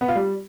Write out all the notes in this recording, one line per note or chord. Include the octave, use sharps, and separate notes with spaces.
B3
F4
G3